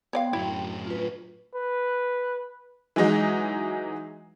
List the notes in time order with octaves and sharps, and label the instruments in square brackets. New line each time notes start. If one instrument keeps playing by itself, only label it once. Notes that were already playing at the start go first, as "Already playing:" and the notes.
[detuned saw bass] B3 [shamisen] C#5 D5 F5 [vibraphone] G5 C6
[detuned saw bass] F#2 [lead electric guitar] A2 F#3 [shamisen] E4
[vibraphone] F4 B4
[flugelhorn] B4
[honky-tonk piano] E3 F#3 G#3 D#4